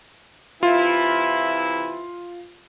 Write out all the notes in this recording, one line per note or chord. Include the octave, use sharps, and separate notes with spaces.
C3 E3 E4 F4